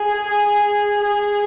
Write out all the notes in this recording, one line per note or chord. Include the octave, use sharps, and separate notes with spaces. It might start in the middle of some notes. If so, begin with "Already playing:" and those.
Already playing: G#4
G#4